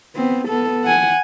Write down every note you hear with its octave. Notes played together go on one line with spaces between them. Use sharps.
B3 C4
B3 A4
F#5 G#5